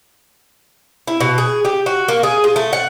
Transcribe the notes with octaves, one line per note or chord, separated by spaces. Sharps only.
E4
B2
G#4
G4
F#4
A#3
G#4
F4
A3
F#5